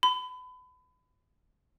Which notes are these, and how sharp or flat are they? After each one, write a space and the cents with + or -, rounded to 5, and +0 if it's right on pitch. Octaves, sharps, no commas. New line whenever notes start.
B5 +30